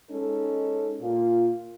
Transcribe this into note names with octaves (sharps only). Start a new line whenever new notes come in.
G#3 C#4 D#4 A4
A#2 F4